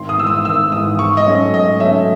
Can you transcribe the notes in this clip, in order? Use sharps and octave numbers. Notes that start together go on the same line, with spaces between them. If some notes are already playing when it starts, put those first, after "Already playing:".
Already playing: G#1 C6
D#6
G#2 E3 E6
D#6
G#1 E6
G#2 E3 D#6
G#2 C#6
D#5
F#3 A3 C#4
D#5
G#2 D#5
F#3 A3 C#4 E5